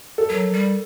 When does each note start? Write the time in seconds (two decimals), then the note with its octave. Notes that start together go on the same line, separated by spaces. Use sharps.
0.18 A4
0.29 F#3 A#4
0.53 G3